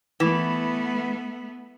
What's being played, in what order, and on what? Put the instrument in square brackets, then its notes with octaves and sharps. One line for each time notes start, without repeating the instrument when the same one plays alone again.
[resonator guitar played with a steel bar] E3 [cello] A3 B3